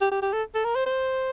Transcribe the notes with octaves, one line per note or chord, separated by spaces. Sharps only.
G4
G4
G4
A4
A4
A#4
C5
C5